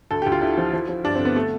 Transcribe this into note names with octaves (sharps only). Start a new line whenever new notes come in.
D2 A4
D2 G4
F4
D3 E4
F3
F3
F3
G2 D4
D3 C4
B3
A3